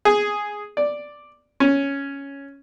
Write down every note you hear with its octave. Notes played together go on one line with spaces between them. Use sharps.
G#4
D5
C#4